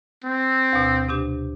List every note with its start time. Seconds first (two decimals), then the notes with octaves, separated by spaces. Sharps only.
0.24 C4
0.73 D2 B2
1.09 C3 D4 G4